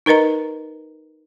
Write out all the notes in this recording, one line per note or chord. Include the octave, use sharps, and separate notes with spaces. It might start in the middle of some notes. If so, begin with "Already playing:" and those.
D#4 A#4 B4 D#5 A#5